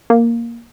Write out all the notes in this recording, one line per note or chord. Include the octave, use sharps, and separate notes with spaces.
A#3